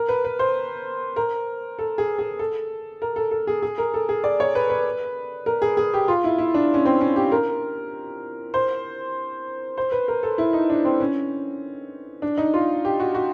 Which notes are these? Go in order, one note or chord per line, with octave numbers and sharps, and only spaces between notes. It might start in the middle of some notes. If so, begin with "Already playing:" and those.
Already playing: A#4
B4
B4
C5
A#4
A4
G#4
G#4
A4
A#4
A4
A4
G#4
G#4
A#4
A4
G#4
D5
C#5
B4
B4
A#4
G#4
G#4
G4
F4
E4
E4
D4
C#4
C4
C#4
G4
A#4
C5
C5
B4
A#4
A4
E4
D#4
D4
C4
C#4
D4
D#4
F4
G4
F#4
F#4